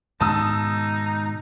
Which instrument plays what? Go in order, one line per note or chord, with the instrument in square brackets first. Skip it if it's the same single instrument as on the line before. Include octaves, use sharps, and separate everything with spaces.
[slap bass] G#2 B2 D#3 [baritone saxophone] D#4 [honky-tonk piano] A5 D#6 E6